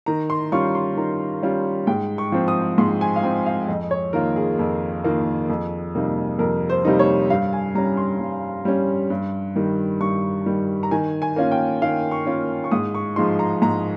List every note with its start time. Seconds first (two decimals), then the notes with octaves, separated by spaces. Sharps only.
0.06 D#3 A#5
0.30 C6
0.52 G3 C#4 F4 C#6
0.75 C6
0.97 D#3 A#5
1.43 G3 C#4 F4
1.87 G#2 G5
2.18 C#6
2.32 F3 C4
2.48 D#6
2.78 G#2 C6
3.01 G#5
3.16 F5
3.23 F3 C4 G5
3.46 F5
3.68 F2 D#5
3.91 C#5
4.13 D#3 A#3 F4 A#4
4.36 G#4
4.59 F2
5.04 D#3 A#3 F4
5.50 F2
5.95 C3 G3 A#3 D#4
6.39 F2 A#4
6.70 C5
6.85 C3 G3 A#3 D#4
6.99 C#5
7.30 G2 F5
7.53 G#5
7.75 G3 C#4 A#5
7.97 C6
8.20 G2
8.65 G3 C#4
9.10 G2
9.56 D#3 G3
10.00 G2 C#6
10.46 D#3 G3
10.83 A#5
10.91 D#3 G#5
11.22 G#5
11.36 A#3 C#4 F4
11.51 G5
11.82 D#3 F5
12.11 C#6
12.26 A#3 C#4 F4
12.64 C#6
12.71 G#2 D#6
12.94 C#6
13.16 F3 G#3 D#4 C6
13.39 A#5
13.62 G#2 A#5